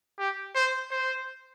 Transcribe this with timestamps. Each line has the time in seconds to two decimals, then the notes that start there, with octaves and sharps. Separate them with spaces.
0.19 G4
0.55 C5
0.91 C5